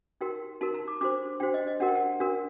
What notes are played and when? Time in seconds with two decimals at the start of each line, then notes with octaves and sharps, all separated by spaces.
0.21 D#4 F#4 A#4 G5
0.61 D#4 F#4 A#4 A5
0.74 A#5
0.88 D6
1.01 D4 F#4 C5 D6
1.40 D4 F#4 C5 G5
1.54 D#5
1.67 D#5
1.80 D4 F#4 A#4 F#5
1.88 G5
1.95 F#5
2.20 D4 F#4 A#4